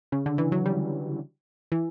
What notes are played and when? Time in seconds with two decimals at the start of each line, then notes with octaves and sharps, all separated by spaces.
0.12 C#3
0.26 D3
0.38 E3
0.52 F#3
0.66 G3
1.72 E3